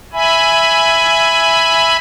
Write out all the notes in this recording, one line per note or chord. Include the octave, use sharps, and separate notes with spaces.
E5 G#5 B5